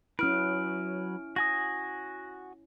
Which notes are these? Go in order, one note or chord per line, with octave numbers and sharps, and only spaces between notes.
F#3 C#4 E4 B4 F6 D7
F#4 G#5 D#6 A#6